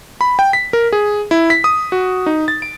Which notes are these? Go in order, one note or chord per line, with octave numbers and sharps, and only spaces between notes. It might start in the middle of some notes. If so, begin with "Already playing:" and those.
B5
G5
B6
A#4
G#4
E4
B6
D#6
F#4
D#4
A6
D7